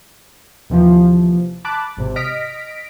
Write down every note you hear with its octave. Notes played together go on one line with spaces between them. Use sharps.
D#2 C3 E3 F3
A5 B5 D6 F#6
G#1 C3
D#5 F6 A#6 B6 D7